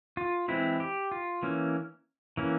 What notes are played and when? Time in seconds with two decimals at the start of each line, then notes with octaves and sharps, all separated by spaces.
0.17 F4
0.48 E3 G#3 C4 E4
0.80 G4
1.12 F4
1.43 E3 A#3 C#4
2.37 E3 A#3 C#4